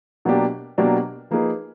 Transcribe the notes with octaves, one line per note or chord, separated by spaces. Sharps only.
B2 F#3 A#3 D4 G4
B2 F#3 A#3 D4 G4
F3 A#3 D#4 G#4 B4